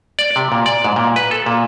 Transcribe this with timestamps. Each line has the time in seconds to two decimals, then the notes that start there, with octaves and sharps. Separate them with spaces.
0.19 D5
0.36 C3
0.52 A#2
0.66 D5
0.84 G#2
0.96 A#2
1.16 B4
1.31 A4
1.46 A#2